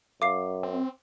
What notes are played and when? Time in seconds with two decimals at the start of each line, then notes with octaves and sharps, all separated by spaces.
0.22 F#2 F5 D6 C7
0.63 C4